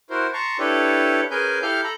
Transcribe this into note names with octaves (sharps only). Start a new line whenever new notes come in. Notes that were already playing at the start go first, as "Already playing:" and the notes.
E4 F#4 A#4 C5
A5 A#5 C6 C#6
D4 E4 G4 A4 B4 C#5
C#4 G#4 A#4 B4 G#5 G6
E4 G4 A4 F5 F6 G6
A4 A#5 B5